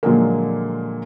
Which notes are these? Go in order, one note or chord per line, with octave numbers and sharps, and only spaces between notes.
A#2 D3 F3 F#3 G#3 A#3